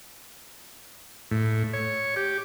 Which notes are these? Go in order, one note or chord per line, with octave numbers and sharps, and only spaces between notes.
A2
C#5
G4